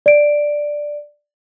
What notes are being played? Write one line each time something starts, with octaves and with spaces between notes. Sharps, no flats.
D5 D7